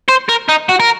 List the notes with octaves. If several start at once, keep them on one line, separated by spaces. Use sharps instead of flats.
C5
A#4
D#4
F#4
A#4